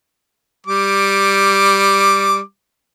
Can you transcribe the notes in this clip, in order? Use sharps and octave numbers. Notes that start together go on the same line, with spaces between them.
G3 D6